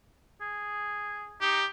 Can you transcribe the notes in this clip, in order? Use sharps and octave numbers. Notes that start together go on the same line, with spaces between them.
G#4
D#4 G4